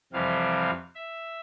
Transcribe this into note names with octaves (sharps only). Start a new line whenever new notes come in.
F2 C3 E3 G3 F5
E5